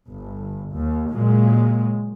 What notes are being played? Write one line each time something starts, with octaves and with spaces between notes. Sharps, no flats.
G1
D#2
A#2 C#3 F#3 G#3